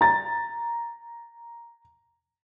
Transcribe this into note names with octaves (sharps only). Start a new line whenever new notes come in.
A#5 A6